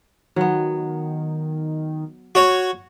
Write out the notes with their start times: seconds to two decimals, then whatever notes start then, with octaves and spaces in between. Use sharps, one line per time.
0.36 D#3 F#3 B3
2.35 F#4 C#5